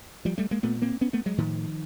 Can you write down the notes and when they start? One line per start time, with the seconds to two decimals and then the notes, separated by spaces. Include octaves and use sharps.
0.25 F3 G3
0.38 G3 A3
0.51 G#3 A#3
0.63 A#2 A3 B3
0.82 A#3 C4
1.01 B3 C#4
1.13 A3 B3
1.26 F#3 G#3
1.38 A2 D#3 F3